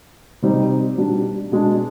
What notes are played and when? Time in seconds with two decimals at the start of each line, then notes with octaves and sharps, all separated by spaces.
0.42 C3 G3 C4 D#4
0.97 B2 G3 D4
1.52 B2 G#3 D4